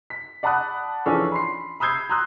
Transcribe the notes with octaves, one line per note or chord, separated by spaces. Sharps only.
B6
D5 F#5 A5 B5 D#6 F#6
E3 F3 C#4 D4 G#4 A4
B5 C6 C7
B5 D#6 E6 G6 G#6 C7
A#5 C6 D#6 E6 F#6 G6